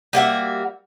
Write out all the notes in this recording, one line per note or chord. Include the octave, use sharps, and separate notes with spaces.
G3 A#3 F#4 E5